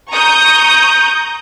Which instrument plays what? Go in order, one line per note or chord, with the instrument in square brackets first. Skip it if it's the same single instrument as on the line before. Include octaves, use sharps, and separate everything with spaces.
[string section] A#5 C#6 D#6 G6